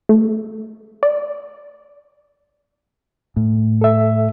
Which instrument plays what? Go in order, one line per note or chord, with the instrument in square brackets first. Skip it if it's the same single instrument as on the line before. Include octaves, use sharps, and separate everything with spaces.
[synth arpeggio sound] A3
D5
[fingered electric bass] A2
[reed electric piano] A4 E5